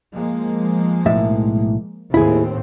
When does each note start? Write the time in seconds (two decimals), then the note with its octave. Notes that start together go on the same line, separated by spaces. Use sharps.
0.14 F3 G#3 A#3
1.06 B1 A2 E5
2.14 D#2 A2 C4 E4 G#4